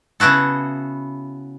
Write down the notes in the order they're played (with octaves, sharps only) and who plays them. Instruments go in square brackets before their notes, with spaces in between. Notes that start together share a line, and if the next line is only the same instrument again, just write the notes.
[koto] C#3 B3 E4 F#4 A4